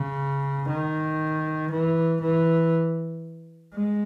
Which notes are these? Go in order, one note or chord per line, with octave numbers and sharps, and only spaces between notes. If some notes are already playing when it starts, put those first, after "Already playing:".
Already playing: C#3
D#3
E3
E3
G#3